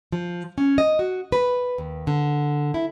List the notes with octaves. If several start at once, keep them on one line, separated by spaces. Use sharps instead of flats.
F3
C#4
D#5
F#4
B4
D#2
D3
E4